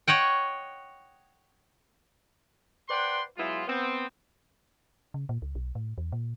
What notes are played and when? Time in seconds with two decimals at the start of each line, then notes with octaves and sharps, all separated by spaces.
0.07 C#5 D#5 F#5 G5
2.89 B4 C5 D5 F#5 G5 C6
3.37 F#3 G#3 B3 E4 F4
3.68 B3 C4
5.14 C#3
5.29 A#2
5.42 C#2
5.55 B1
5.75 A2
5.98 E2
6.12 A#2